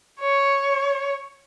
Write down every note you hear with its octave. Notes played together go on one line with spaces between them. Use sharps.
C#5